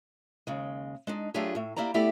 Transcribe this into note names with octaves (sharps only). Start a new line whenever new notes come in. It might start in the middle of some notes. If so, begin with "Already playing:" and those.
D#2 C#3 G#3
G#3 D4 D#4
F#3 A3 D4 F4 G4 G#4
A2 A3
A#3 E4 G4 D5 A#5
A3 B3 E4 G4 A4 D5